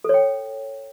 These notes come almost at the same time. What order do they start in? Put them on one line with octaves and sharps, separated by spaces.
A4 C#5 G5